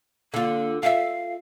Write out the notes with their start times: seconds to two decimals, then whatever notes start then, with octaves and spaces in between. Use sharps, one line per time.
0.34 D3 A#3 F4
0.83 F4 E5 F5